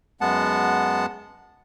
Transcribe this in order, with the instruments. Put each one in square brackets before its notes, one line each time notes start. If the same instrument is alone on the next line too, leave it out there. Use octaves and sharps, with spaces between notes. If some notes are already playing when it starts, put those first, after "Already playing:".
[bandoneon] F#2 G#3 B3 F#5 A5